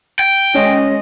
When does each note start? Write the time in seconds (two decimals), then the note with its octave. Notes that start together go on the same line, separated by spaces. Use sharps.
0.19 G5
0.54 G#3 C#4 D#5